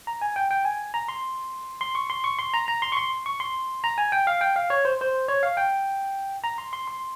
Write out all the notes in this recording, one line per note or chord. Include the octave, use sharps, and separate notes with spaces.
A#5
G#5
G5
G5
G#5
A#5
C6
C6
C#6
C6
C#6
C6
A#5
A#5
C6
C#6
C6
C#6
C6
A#5
G#5
G5
F5
G5
F5
C#5
C5
C5
C#5
F5
G5
A#5
C6
C6
C6